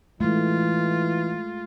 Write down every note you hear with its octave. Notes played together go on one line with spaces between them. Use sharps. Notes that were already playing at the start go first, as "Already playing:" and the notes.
E3 G#3 A3 F4